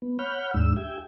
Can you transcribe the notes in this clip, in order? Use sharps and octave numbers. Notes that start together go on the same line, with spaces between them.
B3
C#5 F#5 B5 F6 G6
D#2 G#2 G#3 D4 E6
G4 E5 G5 G#5